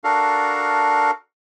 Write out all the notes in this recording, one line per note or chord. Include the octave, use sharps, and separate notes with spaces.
D4 F#4 A4 A#4 F5